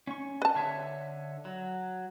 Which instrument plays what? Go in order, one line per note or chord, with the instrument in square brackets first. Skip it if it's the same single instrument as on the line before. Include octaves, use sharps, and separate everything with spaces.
[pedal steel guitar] C#4 C#6
[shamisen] B4 A5
[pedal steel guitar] D3 C#5 E5
F#3